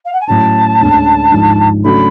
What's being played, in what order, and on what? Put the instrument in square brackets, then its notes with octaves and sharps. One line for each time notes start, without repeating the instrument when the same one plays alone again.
[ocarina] F5
F#5
G#5
[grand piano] A2 F#3 C#4 [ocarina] A5
[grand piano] D2 D3 G#3 C#4
G#1 G#2 F3 G#3 D4
[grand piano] C#3 F#3 A3 D4 F#4 [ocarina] B5